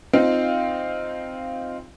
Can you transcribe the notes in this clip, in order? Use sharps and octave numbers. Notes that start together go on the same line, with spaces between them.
C4 D#4 F4 F5